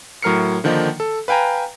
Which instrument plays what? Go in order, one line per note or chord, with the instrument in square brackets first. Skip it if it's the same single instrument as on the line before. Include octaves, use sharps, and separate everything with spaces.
[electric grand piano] A2 F#3 A#4 F6 C7 C#7
D3 D#3 F3 A#3 D#4
A4
B4 F5 G5 G#5 A#5